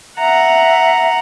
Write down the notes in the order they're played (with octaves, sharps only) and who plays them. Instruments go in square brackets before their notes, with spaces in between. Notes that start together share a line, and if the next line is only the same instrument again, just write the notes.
[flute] E5 [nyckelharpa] F#5 A#5